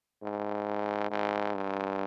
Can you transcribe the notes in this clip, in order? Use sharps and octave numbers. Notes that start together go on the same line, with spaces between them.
G#2
G#2
G2